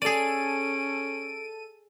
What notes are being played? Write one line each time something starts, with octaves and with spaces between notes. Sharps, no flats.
C#4 G#4 A4 D5 D7 D#7